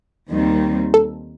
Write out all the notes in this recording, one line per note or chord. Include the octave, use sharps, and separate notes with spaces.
D#2 D#3 G3 C4
A4